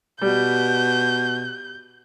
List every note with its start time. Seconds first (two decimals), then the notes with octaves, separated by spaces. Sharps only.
0.22 B2 G3 G6